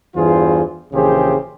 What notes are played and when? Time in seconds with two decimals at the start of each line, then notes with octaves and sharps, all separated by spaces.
0.16 E2 G2 E3 F4 G#4 C5
0.93 A#1 C#3 E3 G4 G#4 C5